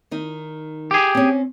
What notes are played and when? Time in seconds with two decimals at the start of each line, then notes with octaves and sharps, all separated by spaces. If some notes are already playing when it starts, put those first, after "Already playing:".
0.11 D#3 D#4
0.91 G4 G#4
1.15 C4 C#4